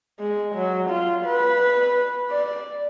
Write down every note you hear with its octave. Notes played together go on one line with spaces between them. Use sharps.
G#3
F#3
F4
B4
D5